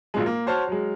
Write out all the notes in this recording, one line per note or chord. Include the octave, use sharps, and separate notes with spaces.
A#1 A#2 F#3 G#3
A#3
F#4 C5 C#5 A5 C6 F6
F#3 G#3